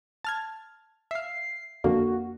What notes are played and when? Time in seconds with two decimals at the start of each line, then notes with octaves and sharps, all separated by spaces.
0.24 A5 F6 G#6
1.11 E5 F5 C7
1.84 F2 D3 A#3 F#4